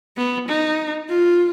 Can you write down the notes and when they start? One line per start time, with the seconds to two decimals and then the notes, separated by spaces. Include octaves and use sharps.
0.17 B3
0.48 D#4
1.09 F4